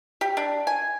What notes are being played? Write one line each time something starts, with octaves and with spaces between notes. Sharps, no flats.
G4
D4
G#5